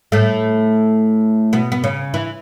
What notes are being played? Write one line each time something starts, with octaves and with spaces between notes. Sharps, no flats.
A2 A3
B2 B3
B3
C#3 C#4
E3 E4